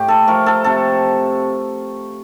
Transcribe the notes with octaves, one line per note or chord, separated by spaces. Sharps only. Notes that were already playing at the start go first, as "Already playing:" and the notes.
Already playing: A2 G4
A4
F3 A3 A#4
A4
C3 A4